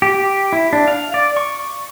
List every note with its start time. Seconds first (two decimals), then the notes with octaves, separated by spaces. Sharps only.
0.02 G4
0.53 E4
0.73 D4
0.88 F5
1.14 D5
1.37 C#6